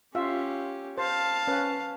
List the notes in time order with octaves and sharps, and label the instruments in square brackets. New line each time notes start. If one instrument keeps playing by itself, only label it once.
[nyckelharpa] C#4 G4 [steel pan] F4 E5
[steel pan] C5 [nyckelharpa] F5 A5
[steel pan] C#4 B4